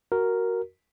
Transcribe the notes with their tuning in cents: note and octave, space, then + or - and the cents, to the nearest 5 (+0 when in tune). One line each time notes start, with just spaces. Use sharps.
F#4 +5 A#4 +0